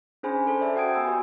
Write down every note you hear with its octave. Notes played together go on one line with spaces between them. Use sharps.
C#4 D4 G#4 C5 G#5 B5
A4 C5
C5 D5 E5 A5 A#5
F#4 F#5 G5 D#6 G#6 D7
B3 G#5 B5 E6 D7
F#4 G4 B4 G5